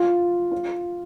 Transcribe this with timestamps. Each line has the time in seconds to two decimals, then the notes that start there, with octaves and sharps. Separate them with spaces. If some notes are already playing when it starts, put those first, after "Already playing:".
Already playing: F4
0.52 F4